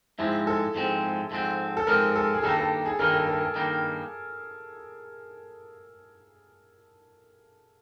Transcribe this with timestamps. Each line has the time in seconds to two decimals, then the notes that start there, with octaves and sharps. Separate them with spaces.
0.19 G#2 F3 G#3 C4 E4
0.47 A4
0.75 G#2 F3 G#3 C4
1.31 G#2 F3 G#3 C4
1.77 A4
1.87 G#2 F3 G#3 C4 A#4
2.16 A4
2.34 G#4
2.43 G2 D#3 G3 A#3 D#4 A4
2.57 A4
2.86 G#4
2.99 G2 D#3 G3 A#3 D#4 A#4
3.14 A4
3.27 A4
3.41 A4
3.55 G2 D#3 G3 A#3 D#4